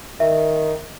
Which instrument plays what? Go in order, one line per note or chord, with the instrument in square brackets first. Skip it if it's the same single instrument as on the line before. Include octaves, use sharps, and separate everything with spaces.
[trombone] D#3 [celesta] E5